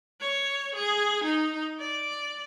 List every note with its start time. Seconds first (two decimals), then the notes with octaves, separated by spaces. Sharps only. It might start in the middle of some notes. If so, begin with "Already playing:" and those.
0.21 C#5
0.75 G#4
1.24 D#4
1.80 D5